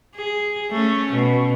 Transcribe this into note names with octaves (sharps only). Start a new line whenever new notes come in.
G#4
A3 C#4
B2